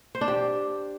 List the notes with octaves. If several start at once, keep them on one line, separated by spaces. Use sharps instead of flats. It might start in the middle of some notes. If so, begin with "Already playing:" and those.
C5
D4
G4